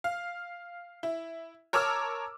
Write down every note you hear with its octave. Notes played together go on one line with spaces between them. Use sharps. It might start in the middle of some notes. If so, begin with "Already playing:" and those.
F5
E4
A#4 C#5 A5 D6 E6 F6